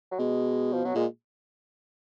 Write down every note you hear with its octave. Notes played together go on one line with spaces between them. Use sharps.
F#3
B2 G#3
F3
B2 F#3
A#2 G#3